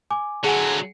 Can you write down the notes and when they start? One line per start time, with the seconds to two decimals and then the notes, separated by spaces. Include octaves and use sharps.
0.10 G#5 D6
0.44 D3 F#3 G#4 F#5 G#5